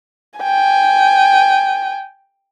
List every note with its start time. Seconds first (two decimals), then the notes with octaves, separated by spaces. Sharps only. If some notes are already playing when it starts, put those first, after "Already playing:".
0.40 G5 G#5